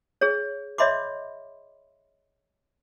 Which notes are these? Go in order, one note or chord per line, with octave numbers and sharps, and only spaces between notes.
G#4 C#5
C#5 D#5 E5 B5 C6 D6